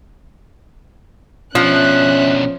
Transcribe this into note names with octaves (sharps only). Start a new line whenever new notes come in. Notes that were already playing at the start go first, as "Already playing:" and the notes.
B2 F3 C#4 D4 E5 F#6